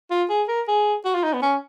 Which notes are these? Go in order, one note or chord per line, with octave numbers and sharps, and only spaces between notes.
F4
G#4
A#4
G#4
F#4
F4
D#4
B3
C#4